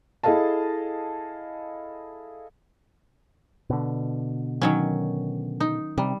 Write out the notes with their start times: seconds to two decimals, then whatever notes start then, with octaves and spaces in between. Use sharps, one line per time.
0.23 E4 G#4 A4 D#5 F5 A5
3.70 B2 D3
4.62 D#3 F#3 C#4
5.60 D#4
5.98 C3 G3